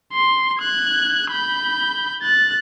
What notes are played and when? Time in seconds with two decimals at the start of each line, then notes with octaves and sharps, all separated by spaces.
0.13 C6
0.59 F#6 G#6
1.31 B5 G6
2.22 F#6 A6